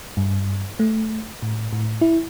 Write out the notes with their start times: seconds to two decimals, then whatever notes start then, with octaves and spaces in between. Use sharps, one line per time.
0.17 G2
0.79 A3
1.42 A2
1.73 A2
2.01 E4